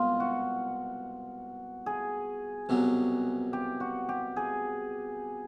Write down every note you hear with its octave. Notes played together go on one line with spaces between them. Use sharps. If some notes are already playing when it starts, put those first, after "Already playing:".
Already playing: C2 B2 G#3 F4
F#4
G#4
C2 B2 F#3
G4
F#4
G4
G#4